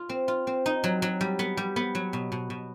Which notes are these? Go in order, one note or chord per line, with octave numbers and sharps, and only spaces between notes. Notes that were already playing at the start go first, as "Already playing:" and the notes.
Already playing: F4
C4
F4
C4
D#4
F#3
F#3
G3
B3
G3
B3
F#3
B2
B2
B2